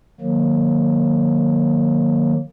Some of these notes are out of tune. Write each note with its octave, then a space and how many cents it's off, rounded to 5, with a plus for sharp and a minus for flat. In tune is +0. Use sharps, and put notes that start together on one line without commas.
D#3 -30 F#3 -35 A#3 +0